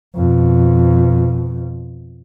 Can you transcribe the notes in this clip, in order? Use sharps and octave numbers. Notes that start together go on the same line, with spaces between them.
F2 B2